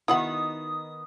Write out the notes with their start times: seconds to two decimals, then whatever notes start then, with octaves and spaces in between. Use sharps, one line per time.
0.08 D#3 B3 D#4 E4 F#4 F#5 D#6